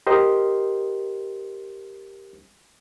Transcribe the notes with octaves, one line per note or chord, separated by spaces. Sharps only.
G4 A#4 C5 D#5 C6